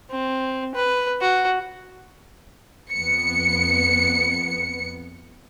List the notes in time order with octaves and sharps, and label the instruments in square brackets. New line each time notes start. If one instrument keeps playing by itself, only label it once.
[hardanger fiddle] C4
B4
F#4
[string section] F2 B3 C#7